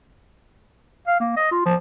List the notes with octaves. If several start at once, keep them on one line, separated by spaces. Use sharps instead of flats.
F5
A#3
D#5
F4
F3